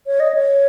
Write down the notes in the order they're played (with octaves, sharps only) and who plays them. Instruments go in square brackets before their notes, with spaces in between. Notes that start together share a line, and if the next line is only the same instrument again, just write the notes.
[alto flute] C#5
D#5
C#5